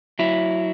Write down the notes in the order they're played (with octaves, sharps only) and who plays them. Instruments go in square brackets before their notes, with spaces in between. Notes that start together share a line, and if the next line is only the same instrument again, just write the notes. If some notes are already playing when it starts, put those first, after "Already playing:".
[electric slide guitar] F#3 E4